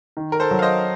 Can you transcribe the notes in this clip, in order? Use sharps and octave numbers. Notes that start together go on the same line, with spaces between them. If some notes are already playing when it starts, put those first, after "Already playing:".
D#3
A#4
A4 C5
F#3
F5
C5 D#5